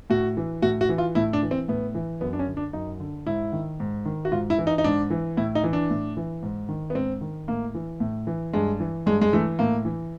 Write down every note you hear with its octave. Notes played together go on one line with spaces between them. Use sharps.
A2 F#4
E3
A2 F#4
F#4
E3
F4
A2 E4
D4
E3
C4
A2 B3
E3
F#2 B3
D4
C#4
D3
D4
F#2 D#4
D3
G#2 E4
D#3
G#2
D#3
F#4
G#2 F4
E4
E3
D#4
D#4
G#2 D4
E3
A2 E4
D#4
E3
D4
A2
E3
G#2
D#3
B3
G#2 C4
D#3
A2 A#3
E3
A2
E3
G2 G#3
E3
G2 G#3
G#3
E3 A3
A2 A#3
E3